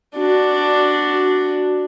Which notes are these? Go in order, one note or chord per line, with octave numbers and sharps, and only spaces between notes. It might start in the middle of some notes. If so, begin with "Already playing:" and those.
D4 F#4